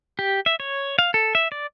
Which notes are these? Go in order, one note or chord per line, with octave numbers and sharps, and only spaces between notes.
G4
E5
C#5
F5
A4
E5
D5